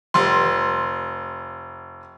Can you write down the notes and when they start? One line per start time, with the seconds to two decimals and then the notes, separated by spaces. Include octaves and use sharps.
0.14 F1 C6